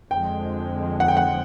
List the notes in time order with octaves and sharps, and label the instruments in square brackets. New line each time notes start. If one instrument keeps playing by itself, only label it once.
[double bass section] F2 D3 F3 G#3 [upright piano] G5
[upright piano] F#5
G5
F#5